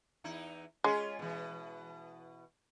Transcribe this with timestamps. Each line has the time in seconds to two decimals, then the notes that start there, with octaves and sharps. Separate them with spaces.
0.24 E2 D#4 E4
0.84 G#3 C#4 F4 G#4
1.19 B2 E3